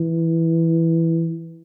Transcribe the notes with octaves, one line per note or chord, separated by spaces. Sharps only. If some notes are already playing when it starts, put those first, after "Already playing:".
Already playing: E3